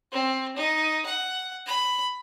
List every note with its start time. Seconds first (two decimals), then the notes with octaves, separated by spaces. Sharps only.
0.12 C4
0.56 D#4
1.06 F#5
1.67 B5